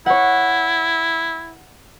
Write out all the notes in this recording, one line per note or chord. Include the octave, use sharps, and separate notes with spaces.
E4 C#5 F#5